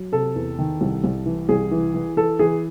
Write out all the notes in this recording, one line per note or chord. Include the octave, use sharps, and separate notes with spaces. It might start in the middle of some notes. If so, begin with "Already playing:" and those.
Already playing: F#3
C3 A4
E2
D#3
C2
C2
E3
C2 G#4
E3
E3
E3 A4
E3 G#4